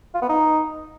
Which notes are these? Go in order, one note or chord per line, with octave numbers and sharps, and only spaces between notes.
F4
B3
D#4